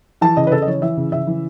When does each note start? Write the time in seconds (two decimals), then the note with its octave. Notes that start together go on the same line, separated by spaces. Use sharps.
0.21 E3 A5
0.37 C#3 D#5
0.47 B4
0.51 C#3 A4
0.62 D#5
0.66 E3 C#5
0.82 E3 E5
0.97 C#3
1.12 C#3 E5
1.27 E3